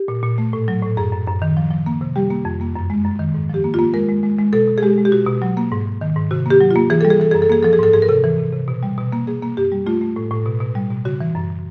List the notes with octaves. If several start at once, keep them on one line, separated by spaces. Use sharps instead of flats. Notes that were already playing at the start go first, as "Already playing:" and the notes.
Already playing: G4
A#2
A#2
A3
A2
F#3
A2
F#2 G#4
F#2
F#2
D#3
F3
F3
A#3
C3
G3 G4
A#3
F2
A#3
F#2
G#3
F#2
D#3
G#2
F3 G4
A#3
F4
A#3
G#3 A#4
G#3
G#3
G#3
B2 A4
B2
G#4
G#3 G4
G#3
G4
B2 F#4
B2
F#3
A#3
G#2
G#2
D#3
G#2
C3 F#4
A#3 G4
F#3
A#3 F4
E3 G#4
G3 A4
G#4
E3 A4
F#2 G#4
A4
A#3 G#4
F3 A4
G#4
G#2 A4
G#2 G#4
A#4
C3 A4
E3
C3
C3
B2
G3
B2
A#3
A#3 G#4
A#3
F#2 G4
G3
A3 F4
A3
A2
A2
B2
B2
G3
B2
C#3 F#4
E3
F#2